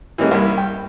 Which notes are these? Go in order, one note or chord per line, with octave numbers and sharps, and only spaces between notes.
E3 G3 G#3 A#3 C#4 D#4
C2 G2 A#3 E4
G5